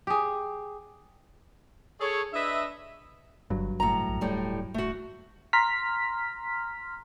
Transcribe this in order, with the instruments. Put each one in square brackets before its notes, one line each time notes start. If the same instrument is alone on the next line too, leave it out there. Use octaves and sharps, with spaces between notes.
[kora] G4 G#4
[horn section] G#4 A4 C#5
D4 B4 D#5 E5
[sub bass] G1 [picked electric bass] G2 F#3
[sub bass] F#1 [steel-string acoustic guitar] A2 A#5
[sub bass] A#1
[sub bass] D1 [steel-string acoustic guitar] A2 G3
[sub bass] D1 [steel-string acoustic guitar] A3 F#4
[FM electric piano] A#5 C6 F6 B6